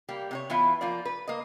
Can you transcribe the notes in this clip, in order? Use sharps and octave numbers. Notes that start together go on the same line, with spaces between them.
G3 A#3 G4
C3 G4 C#5
E3 B3 E4 F4 E5
F3 A#3 F4 D5
B4
A#3 D#5